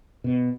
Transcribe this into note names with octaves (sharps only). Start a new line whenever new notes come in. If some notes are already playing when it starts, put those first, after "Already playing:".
B2